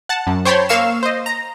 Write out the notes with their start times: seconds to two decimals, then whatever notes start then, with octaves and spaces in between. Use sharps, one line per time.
0.09 F#5 A5
0.27 F#2
0.45 C5 C#5 G5 A5 B5 C6
0.69 A#3 F5 C#6 E6 E7
1.03 C5 D#5
1.26 A#5